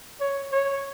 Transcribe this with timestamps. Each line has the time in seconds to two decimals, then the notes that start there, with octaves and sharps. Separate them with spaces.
0.20 C#5
0.52 C#5